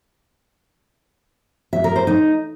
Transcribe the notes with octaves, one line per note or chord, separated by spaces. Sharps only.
E5
A#4
C5
D#4